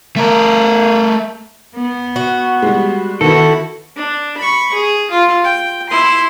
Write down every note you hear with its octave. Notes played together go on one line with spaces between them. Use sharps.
A3 A#4
B3
F#4
G3 G#3
D#3 B3 E4 F#4 A4
D4
B5 C#6
G#4
F4
G5
E4 C6